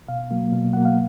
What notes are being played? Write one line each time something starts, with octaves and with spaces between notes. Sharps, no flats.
B2 F5
F#3 A#3
B2
F#3 A#3 F#5
F5